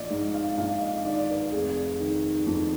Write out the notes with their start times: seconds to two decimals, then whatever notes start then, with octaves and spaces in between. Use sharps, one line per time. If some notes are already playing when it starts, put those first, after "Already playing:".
Already playing: A#1 D5 D#5
0.10 G#2 D#5
0.34 F5
0.58 A#1 F5
0.81 D#5
1.05 D#3 D5
1.18 D5
1.29 B4
1.52 F1 G#4
2.00 D#3
2.46 F2